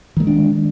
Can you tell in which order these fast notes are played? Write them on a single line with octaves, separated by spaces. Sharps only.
D#3 A3 G#3 D4